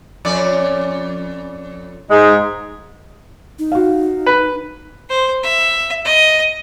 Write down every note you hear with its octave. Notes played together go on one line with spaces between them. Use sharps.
F2 C#4 D5
G#2 G#3 D#4
D#4
F#4 F5
B4
C5
E5
D#5